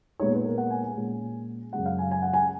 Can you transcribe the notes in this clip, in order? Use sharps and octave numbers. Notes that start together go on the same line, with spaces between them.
A#2 G#3 B3 D#4 C#5
B4
A#4
F#5
G#5
G#5
A#2 G#3 C#4
F#2 C#3 G#3 F#5
F5
G#5
G#5
F#5
G#5